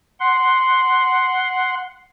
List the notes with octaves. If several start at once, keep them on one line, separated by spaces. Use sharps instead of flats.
F#5 C6